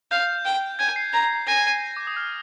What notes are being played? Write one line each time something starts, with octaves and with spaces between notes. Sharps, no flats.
F5 G6
G5
G#5 G#6
C7
A#5
G#5 A#6
D6
D#6
F6